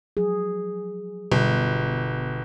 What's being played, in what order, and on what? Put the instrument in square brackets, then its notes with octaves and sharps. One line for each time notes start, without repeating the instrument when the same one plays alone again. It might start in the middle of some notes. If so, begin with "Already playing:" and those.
[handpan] F3 F#3 G#4
[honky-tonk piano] G1 [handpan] B2